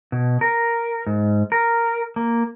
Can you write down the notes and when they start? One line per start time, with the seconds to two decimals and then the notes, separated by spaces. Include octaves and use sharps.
0.12 B2
0.41 A#4
1.07 G#2
1.52 A#4
2.16 A#3